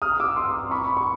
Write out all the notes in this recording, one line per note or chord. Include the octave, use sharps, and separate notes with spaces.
D#6 F6
D6 E6
C6 D6
B5 C#6
C#6